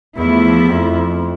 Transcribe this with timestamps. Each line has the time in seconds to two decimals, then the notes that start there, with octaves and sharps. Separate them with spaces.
0.17 E2 F3 A3 E4
0.70 F2